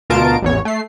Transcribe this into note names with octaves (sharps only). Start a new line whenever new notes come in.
D2 B2 F4 A#4 A5 D7
A1 E2 C#5
A3 C7